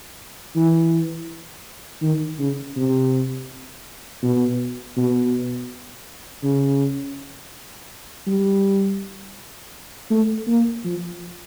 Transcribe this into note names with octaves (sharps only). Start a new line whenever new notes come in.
E3
D#3
C#3
C3
B2
B2
C#3
G3
A3
A#3
F3